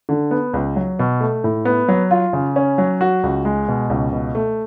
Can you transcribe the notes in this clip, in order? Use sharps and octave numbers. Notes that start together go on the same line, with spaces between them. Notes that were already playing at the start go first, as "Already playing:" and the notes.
D3
B3
C#2
F#3
B2
A3
A2
B3
F#3
F4
C#3
C#4
F#3
F#4
C#2
G#3
B2
C#2
B2
A3